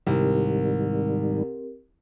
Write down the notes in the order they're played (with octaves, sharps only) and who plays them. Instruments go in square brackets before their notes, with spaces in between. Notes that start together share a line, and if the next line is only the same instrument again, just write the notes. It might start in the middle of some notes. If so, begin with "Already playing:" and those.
[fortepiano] C2 [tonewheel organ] G#2 D#3 G3 [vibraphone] C4 G4 A#4